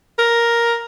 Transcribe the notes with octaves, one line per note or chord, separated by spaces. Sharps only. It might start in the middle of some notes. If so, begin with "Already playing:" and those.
A#4